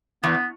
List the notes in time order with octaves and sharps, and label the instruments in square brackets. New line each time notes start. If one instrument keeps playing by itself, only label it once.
[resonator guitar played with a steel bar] E2 [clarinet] B3